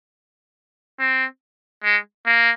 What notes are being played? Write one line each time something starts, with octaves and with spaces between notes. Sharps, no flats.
C4
G#3
A#3